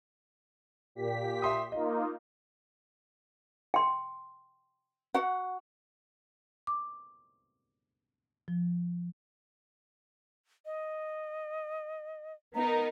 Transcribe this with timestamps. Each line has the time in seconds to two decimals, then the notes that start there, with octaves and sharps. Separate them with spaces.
0.95 A#2 G4 B6
1.42 E5 C6 D#6
1.72 A#3 D#4 F4 D#5
3.74 G5 C6
5.14 F#4 F#5
6.67 D6
8.48 F3
10.66 D#5
12.55 B3 D#4 A#4 A#5